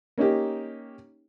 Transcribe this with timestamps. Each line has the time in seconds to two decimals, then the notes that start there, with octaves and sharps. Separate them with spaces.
0.18 A#3 C#4 D#4 G4